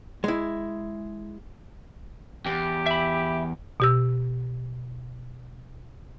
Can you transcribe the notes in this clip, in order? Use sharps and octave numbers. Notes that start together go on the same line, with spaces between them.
G#3 E4
E2 G4
E5 B5
B2 G4 E6